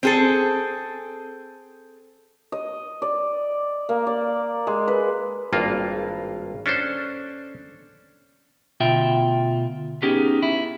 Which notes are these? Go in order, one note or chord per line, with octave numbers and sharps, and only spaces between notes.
C4 G#4 A4
D#5
D5
A#3
D5
G#3
B4
G#1 G2 A#3 F4
C#4 D4 A4 C5
D2 B2 F4 E5 G5
B3 C#4 D#4 G4 G#4
E4